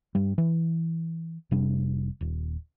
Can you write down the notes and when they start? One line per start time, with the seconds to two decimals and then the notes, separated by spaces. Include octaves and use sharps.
0.15 G2 G3
0.38 E3
1.51 F1 C3 G3 D4
2.21 D#1